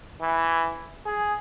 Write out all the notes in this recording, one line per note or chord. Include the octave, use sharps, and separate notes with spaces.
E3
G#4